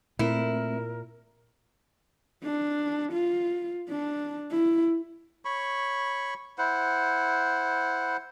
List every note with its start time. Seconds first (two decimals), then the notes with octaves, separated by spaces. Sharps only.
0.19 A#2 A3 C4 E4 A#4
2.44 D4
3.13 F4
3.90 D4
4.51 E4
5.45 C#5 B5 C#6
6.58 E4 C5 F#5